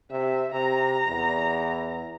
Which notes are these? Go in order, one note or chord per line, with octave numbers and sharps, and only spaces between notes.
C3 E5
C3 A#5
E2